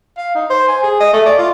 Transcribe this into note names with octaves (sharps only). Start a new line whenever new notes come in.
F5
D#4
C5
G#5
G#4
D#5
A3
D5
F4